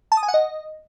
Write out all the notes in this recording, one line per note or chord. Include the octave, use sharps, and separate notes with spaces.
A5
D#6
G#5
F#5
D#5